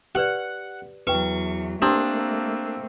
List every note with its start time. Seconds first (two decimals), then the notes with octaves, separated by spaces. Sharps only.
0.15 G4 B4 D5 F#5
1.07 E2 F#3 B4 G5 C#6
1.82 A3 A#3 C4 D4 G4 A#5 D#6